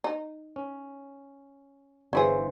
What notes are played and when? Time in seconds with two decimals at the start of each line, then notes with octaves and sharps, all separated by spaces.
0.04 D#4
0.56 C#4
2.13 G1 E3 C#4 E4 G#4 C5